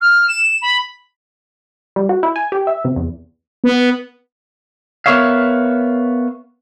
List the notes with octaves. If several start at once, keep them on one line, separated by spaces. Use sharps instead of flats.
F6
E7
B5
G3
F#4
E4
G#5
G4
E5
C3
E2
B3
B3 A#4 B4 C#5 E5 F5